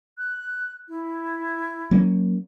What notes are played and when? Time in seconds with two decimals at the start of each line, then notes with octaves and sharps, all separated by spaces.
0.18 F#6
0.89 E4
1.91 F#3 A#3 C#4